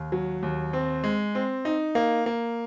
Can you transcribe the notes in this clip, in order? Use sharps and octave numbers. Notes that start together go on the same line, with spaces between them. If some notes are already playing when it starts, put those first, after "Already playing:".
Already playing: D#2
F#3
D#2
C4
G#3
C4
D#4
A#3
A#3